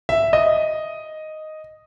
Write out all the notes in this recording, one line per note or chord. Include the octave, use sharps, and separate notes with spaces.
E5
D#5